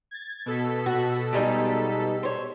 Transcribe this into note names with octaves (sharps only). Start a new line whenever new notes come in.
G#6 A6
B2 A4 B6
F#4
G3 G#3 D#4
C5 C#5